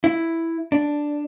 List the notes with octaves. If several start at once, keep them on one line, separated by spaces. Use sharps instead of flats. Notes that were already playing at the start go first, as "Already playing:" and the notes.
E4
D4